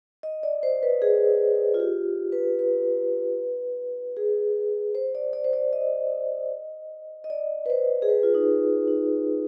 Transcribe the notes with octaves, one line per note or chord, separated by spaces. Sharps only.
D#5
D5
C5
B4
G#4
F4
G4
B4
B4
G#4
C5
D5
D5
C5
D5
D#5
D#5
D5
B4
C5
G#4
B4
F4
D#4
D#4